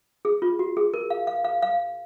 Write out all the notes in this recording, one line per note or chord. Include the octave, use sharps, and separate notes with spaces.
G#4
F4
F#4
G#4
A#4
F5
F5
F5
F5